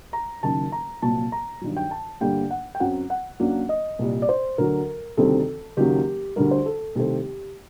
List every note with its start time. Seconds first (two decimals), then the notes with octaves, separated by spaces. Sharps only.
0.13 A#5
0.43 F#1 F#2 D#3 A5
0.72 A#5
1.02 C2 A#2 F#3 A#3 A5
1.32 A#5
1.61 G2 D#3 F#3
1.76 G5
1.91 A5
2.21 G1 G2 D3 G3 A#3 G5
2.51 F#5
2.75 G5
2.80 F#2 F#3 C4 F#5
3.10 F#5
3.40 F#2 F#3 A#3 D4
3.69 D#5
3.99 C2 A#2 G3
4.22 D5
4.29 C5
4.58 D2 D3 F#3 A#4
5.17 D2 C3 D#3 G3 C4 A4
5.77 F#1 F#2 D#3 F#3 A#3 G4
6.36 D2 D3 G3 A#4
6.51 C5
6.66 A4
6.95 C2 C3 D#3 A3 C4 G4